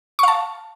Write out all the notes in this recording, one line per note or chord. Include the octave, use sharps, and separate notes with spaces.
F5 A5 C#6